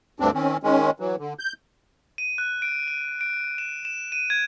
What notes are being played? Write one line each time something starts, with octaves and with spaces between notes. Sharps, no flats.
D2 G2 C4 D4
D#3 C4 C#4
D#3 G#3 C#4
E3 F#3
D3
G6
D#7
F#6
D7
D#7
D7
E7
E7
D#7
G#6